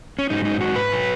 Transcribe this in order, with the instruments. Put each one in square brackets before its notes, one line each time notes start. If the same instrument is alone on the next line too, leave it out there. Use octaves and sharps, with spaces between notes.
[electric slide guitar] C#4
G#2 F#3 D#4
D#4
F#4
B4
F#3